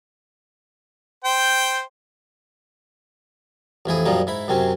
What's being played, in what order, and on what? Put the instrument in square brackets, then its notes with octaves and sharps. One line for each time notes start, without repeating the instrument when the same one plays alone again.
[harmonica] C5 G5
[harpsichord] A1 F2 E4 G#4
F#2 A#2 F3 G3 D#4
G#2 E4 B5
F#2 C3 C4 C#4